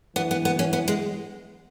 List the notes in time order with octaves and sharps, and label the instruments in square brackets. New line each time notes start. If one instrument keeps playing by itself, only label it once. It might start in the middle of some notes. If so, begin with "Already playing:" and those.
[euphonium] E3 [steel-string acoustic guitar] B3
[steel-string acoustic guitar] B3
B3
[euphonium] E3 [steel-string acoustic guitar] C#4
[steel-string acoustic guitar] B3
G#3